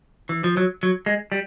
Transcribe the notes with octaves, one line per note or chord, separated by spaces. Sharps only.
E3
F3
F#3
F#3
G#3
G3